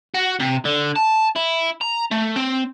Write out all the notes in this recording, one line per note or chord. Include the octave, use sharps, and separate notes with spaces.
F#4
C3
D3
A5
E4
A#5
A3
C4